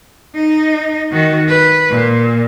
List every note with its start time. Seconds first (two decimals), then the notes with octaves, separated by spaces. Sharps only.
0.35 D#4
1.12 D#3 F#4
1.48 B4
1.91 A#2